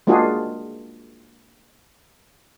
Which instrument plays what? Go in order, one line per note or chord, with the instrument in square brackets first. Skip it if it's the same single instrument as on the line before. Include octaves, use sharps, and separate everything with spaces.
[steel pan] G#3 A#3 D4 F4 F#4 G#4